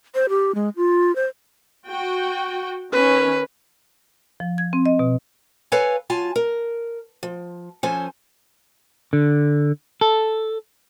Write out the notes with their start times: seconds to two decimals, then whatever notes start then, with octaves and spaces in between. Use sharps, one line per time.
0.15 C5
0.29 G4
0.55 G#3
0.76 F4
1.16 C5
1.86 F#4 G5
2.92 D#3 C#4 B4
4.40 F3
4.58 G#6
4.73 C4
4.86 D#5
4.99 B2
5.72 A4 B4 C#5 F5 G#5
6.10 F#3 F4 G#5 A5
6.36 A#4
7.23 F3
7.83 F3 C#4 A4 C5 G#5
9.13 D3
10.01 A4